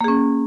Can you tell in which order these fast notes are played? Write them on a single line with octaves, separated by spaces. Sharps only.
A#3 G#4 C#4